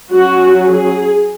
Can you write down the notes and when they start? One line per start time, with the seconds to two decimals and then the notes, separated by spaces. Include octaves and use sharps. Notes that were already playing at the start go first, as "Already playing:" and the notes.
0.12 F#3 C#4 F#4
0.68 G#4